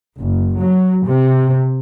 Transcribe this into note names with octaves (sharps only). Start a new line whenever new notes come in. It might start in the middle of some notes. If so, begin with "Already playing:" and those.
F#1
F#3
C3